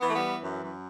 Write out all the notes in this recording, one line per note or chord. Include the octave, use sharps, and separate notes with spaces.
E3 B3
A3
G3 B3
E3
F#2
F#2